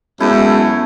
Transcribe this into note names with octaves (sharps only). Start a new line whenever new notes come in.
F#2 G#3 A3 B3 E4